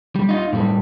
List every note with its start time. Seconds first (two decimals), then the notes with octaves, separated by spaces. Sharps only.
0.16 G3
0.29 D#4 F4
0.53 A2 G3